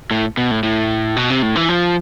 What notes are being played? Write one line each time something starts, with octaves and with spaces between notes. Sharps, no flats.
A2
B2
A2
A2
B2
C3
A2
E3
F3